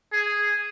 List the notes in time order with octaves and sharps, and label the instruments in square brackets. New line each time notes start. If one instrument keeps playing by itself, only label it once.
[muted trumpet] G#4